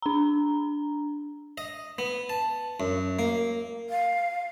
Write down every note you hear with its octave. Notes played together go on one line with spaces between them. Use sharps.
D4 A#5
D#5
B3
A5
F#2
A#3
F5